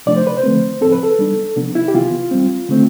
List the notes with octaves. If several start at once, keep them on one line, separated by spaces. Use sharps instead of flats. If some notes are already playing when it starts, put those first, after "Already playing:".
C3 F3 A3 D4 D5
C5
B4
C5
D3 F3 A3 C4
A2 F3 C4 A4
B4
A4
E3 G3 B3 D4
C3 F3 B3 D4
E4
G4
C3 E3 B3 F4
E3 G3 C4
D3 A3 C4